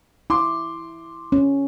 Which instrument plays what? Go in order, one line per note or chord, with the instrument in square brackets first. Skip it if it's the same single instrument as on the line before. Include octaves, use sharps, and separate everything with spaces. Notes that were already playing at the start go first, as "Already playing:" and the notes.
[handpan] E4 [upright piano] C6 D6
[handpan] C#4